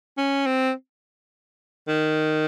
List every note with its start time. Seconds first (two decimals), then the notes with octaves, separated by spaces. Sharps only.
0.18 C#4
0.46 C4
1.88 D#3